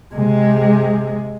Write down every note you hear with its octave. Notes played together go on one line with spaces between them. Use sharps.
C3 G#3